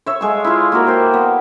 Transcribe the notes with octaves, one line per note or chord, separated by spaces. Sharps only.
C#5 E5 C#6
G#3 A4 F5 C#6
E4 F4
A#3 F#4 A#4
G4 C5
B3